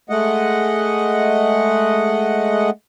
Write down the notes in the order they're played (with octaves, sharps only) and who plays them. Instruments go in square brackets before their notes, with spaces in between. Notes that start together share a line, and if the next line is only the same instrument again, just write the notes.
[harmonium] G#3 A3 D#5 F#5